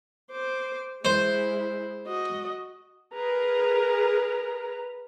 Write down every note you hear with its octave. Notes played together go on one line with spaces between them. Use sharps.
C5 D6
G#3 E4 C5
F#4 D#5
G#4 A#4 B4 A#5